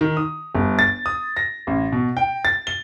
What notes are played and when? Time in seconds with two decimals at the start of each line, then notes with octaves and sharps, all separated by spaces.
0.01 D#3
0.17 D#6
0.55 G1
0.79 A6
1.06 D#6
1.37 A#6
1.67 A1
1.92 B2
2.17 G5
2.45 A6
2.67 G7